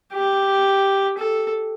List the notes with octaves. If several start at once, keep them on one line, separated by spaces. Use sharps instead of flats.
G4
A4